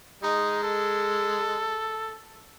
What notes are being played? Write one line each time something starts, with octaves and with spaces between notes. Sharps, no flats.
G#3 D#4
A4